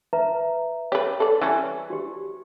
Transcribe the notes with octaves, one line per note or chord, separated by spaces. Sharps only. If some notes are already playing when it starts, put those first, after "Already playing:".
B4 E5 A#5
G4 B4 C#5
A4 D5
E3 G3 C#4
F#4 G4